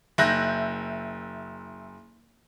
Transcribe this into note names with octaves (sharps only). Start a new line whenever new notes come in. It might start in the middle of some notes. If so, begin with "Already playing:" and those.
F#1 E5 F#6 G6 A#6